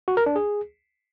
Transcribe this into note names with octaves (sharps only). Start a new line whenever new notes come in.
F#4
A#4
D4
G#4